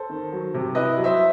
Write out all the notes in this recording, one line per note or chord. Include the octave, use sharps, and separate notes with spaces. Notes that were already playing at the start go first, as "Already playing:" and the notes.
Already playing: A4 C5
D#3
F#3
C3
E4 B4 D#5
F#3
C5 E5